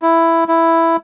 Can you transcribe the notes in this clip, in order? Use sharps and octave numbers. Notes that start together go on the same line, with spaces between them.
E4
E4